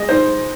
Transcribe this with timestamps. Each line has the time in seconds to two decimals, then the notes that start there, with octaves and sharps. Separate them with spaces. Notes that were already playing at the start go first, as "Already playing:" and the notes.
Already playing: G#3 D#5
0.09 D#4 C5